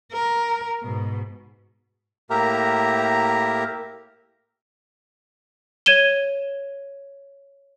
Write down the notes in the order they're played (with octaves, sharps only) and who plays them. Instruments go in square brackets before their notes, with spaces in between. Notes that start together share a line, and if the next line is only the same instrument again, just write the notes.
[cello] A#4
G#2 B2
[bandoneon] A2 A#3 G4 A#4 E5 A#5
[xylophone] C#5 G#6 D#7 E7 G7